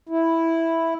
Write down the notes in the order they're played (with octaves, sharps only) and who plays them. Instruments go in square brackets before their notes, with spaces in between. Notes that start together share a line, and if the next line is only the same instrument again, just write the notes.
[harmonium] E4